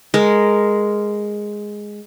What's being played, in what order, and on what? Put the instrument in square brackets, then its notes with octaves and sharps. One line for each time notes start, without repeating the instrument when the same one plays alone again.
[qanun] G#3 A#4